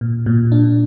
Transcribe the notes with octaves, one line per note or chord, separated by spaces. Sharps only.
A#2
A#2
D4